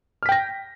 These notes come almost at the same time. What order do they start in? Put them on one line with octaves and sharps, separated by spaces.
F6 B6 G5 A#6